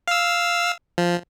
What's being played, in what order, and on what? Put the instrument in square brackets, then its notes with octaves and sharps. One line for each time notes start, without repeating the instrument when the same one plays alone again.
[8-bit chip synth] F5 E6
F3